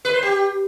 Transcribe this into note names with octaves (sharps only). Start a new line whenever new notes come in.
B4
C5
G4